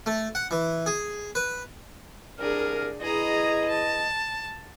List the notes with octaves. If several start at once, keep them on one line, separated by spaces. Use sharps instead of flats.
A3
F#5
E3
G#4
B4
C2 D4 G#4 A#4 F6
E2 E4 G#4 D#5 A#5
A5